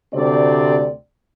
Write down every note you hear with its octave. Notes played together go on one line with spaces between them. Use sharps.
D2 C3 C4 D5